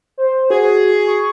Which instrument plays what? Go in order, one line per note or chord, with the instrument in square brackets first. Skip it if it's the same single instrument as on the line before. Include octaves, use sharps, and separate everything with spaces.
[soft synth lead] C5
[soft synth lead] F#4 [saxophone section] G#4
[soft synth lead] C#6